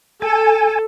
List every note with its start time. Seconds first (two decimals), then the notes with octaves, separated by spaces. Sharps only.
0.22 A4 G#5